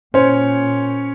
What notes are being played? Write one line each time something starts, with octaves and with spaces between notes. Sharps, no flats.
A#2 C#4 C5 C#5